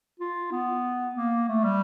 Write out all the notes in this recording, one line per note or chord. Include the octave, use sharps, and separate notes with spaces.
F4
B3
A#3
A3
G3